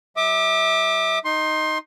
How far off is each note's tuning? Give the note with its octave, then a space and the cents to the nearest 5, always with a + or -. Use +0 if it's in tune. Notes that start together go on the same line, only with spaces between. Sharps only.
G3 -45 E5 -25 D6 +25
D#4 +0 C6 +20